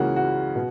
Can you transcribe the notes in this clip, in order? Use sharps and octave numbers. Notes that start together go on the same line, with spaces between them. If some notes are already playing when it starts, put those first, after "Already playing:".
Already playing: C#2 C#3 E3 A#3 C#4 F#4
F#4
B2